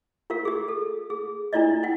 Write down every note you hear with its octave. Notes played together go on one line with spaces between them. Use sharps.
F4 G4 A#4 F5
G4 G#4
A4
G#4
D4 E4 F4 D5 D#5
E4 F#5 G5